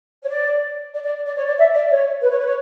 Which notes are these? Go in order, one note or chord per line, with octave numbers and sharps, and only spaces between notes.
C#5
D5
D5
D5
D5
C#5
D5
E5
D5
C#5
B4
C#5
B4
C#5